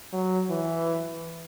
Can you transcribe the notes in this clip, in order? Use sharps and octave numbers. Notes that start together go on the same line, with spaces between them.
F#3
E3